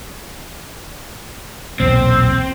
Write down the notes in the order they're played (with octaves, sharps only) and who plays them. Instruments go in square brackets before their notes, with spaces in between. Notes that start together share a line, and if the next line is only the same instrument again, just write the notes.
[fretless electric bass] B1 E2 A#2 [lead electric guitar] C4